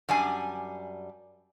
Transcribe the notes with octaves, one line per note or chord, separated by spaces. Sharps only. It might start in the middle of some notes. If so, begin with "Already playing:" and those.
F#2 G3 D4 G#5